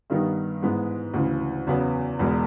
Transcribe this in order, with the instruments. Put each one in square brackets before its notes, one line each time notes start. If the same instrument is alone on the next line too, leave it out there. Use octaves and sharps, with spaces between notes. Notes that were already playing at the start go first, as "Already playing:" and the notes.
[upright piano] G2 D#3 G3 B3 D#4
G#2 E3 G#3 B3
D2 C#3 E3
E2 C#3 F#3 B3
E1 E2 B2 G#3